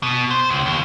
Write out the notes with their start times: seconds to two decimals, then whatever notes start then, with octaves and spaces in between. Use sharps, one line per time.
0.03 B2
0.31 C5
0.50 C#2
0.66 D#2